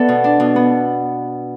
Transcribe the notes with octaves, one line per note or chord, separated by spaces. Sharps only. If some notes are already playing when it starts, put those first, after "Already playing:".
Already playing: B3 A4 B4 D5 E5
B2
D4
B2
B3